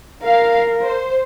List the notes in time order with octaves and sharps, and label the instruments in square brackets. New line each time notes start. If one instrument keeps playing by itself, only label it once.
[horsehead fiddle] A#4 [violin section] F5
[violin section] C5